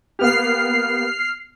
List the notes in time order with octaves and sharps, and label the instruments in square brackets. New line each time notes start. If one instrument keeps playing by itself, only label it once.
[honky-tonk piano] A#3 B3 G4 [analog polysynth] F6 C7